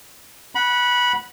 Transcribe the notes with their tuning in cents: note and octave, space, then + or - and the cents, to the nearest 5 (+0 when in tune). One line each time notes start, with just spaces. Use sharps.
F#5 +0 B5 -20